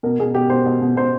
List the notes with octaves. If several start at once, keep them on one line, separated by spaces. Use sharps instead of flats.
B2 A#4
B2 G#4
B2 G4
B2 C5
B2
B2
B2 C5